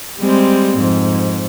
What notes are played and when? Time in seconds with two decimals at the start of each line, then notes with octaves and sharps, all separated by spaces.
0.20 G3 G#3 C4
0.78 F2 G#2